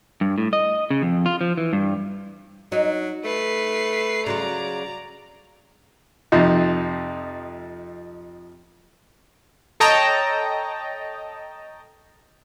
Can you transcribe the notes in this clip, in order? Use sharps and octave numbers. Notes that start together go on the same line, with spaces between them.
G2
A2
D#5
C#3
F2
F4
F3
E3
G2
F#3 D#4
A3 B4 C7
C#3 F#3 F4 D5 A#5
F2 C3 F3 D#4
A4 C#5 D#5 G5 A5 A#5